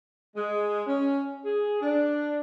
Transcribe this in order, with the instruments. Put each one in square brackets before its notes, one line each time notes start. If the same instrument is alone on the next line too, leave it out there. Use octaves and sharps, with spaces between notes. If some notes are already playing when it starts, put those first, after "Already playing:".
[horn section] G#3
C#4
G#4
D4